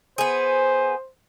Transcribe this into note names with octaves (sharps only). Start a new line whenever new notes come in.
B3 G#4 C5